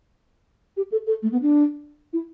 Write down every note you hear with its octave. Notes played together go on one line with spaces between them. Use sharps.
G4
A4
A4
A3
B3
D4
E4